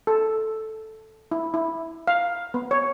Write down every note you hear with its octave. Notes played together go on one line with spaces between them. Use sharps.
A4
E4
E4
F5
B3
C#5